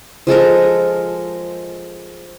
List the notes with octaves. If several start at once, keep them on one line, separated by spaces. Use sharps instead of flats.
F3 G#3 A4 A#4